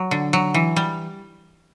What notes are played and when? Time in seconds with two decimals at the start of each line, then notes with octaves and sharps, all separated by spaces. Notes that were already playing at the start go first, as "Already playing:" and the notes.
Already playing: F#3
0.11 D3
0.33 F#3
0.54 E3
0.76 G3